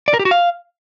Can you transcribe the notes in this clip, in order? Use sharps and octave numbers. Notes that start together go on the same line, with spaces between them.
D5
A#4
G4
F#4
F5